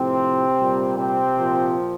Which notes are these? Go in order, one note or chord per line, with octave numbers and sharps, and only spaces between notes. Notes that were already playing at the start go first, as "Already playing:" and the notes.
Already playing: A2 C3 F3 C4
A#2 G3
C3 C4
A#2 F3